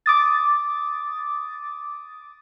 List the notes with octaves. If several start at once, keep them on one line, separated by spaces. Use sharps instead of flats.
D6 D#6 A6